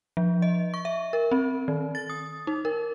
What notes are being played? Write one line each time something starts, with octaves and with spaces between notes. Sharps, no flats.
F3
D#5
C#6
E5
A#4
C4
D#3
A6
D#6
D#4
A#4